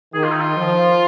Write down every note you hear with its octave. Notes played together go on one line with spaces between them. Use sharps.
D#3 G#4
F4
D#4
F4
F3